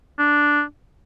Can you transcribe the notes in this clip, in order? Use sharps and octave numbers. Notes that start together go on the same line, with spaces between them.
D4